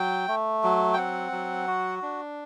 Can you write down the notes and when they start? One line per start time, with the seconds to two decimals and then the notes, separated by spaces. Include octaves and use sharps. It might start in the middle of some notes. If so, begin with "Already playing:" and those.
Already playing: F#3 G5
0.28 A3
0.63 F#3
0.94 G5
0.98 C4 F#5
1.32 F#3
1.67 F#4
2.02 D4